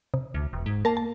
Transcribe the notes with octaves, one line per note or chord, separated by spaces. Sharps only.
C3
D2
E1
G#2
A#3 A#4 A5
A5